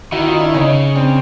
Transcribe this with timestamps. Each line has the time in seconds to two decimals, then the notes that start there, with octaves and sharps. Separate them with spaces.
0.12 D#3 E4 F#4
0.27 D#4 F4
0.40 D4 E4
0.54 C#3 C#4 D#4
0.95 C4 D4